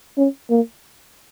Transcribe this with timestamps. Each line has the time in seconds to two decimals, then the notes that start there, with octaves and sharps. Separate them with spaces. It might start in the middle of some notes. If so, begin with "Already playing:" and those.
0.18 C#4
0.50 A#3